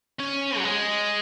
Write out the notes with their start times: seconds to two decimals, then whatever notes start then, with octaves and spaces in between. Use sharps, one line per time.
0.19 C#4
0.58 F#3
0.64 G#3